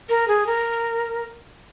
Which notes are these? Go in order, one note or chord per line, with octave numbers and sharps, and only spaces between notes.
A#4
G#4
A#4